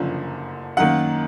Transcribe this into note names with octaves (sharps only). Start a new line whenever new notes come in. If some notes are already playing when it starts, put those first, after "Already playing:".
Already playing: F#1 F#2 D3 F3
F#2 D#3 A#3 F#5